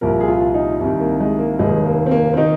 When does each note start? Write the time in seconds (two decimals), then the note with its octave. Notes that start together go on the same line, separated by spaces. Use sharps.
0.01 C2 A#2 F3 A#4
0.20 G#4
0.28 F4
0.54 D#4
0.80 C2 C3 D#3
1.00 A#3
1.20 G#3
1.39 A#3
1.59 F1 D#2 D#3 G#3
1.85 A#3
2.06 C4
2.11 A#3
2.33 C4
2.37 D#3 D#4